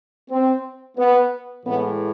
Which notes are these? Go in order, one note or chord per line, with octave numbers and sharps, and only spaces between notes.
C4
B3
A2 E3 G#3 B3